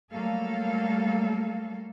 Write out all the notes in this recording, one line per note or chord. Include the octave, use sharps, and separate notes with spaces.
F#3 G3 A3 A#3 A4 F5